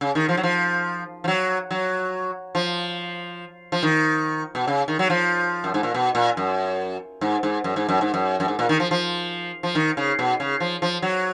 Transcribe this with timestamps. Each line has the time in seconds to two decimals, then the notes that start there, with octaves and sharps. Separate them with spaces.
0.01 C#3
0.15 D#3
0.29 F3
0.37 F#3
0.43 F3
1.24 F3
1.28 F#3
1.71 F#3
2.55 F3
3.72 F3
3.83 D#3
4.55 B2
4.67 C#3
4.88 D#3
4.99 F#3
5.10 F3
5.64 F#2
5.74 G#2
5.83 A#2
5.94 B2
6.15 A#2
6.37 F#2
7.21 G#2
7.43 G#2
7.64 F#2
7.76 G#2
7.89 F#2
8.01 G#2
8.14 F#2
8.40 F#2
8.48 G#2
8.59 A#2
8.69 D#3
8.80 F3
8.91 F3
9.63 F3
9.75 D#3
9.97 C#3
10.19 B2
10.40 C#3
10.60 F3
10.82 F3
11.02 F#3